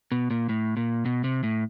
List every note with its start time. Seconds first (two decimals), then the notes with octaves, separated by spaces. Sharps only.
0.12 B2
0.31 A#2
0.49 A2
0.77 A#2
1.06 B2
1.24 C3
1.43 A2